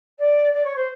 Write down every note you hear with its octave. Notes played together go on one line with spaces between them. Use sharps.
D5
D5
C#5
C5